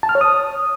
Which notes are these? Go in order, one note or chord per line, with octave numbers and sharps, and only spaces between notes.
A5
F6
C#5
D#6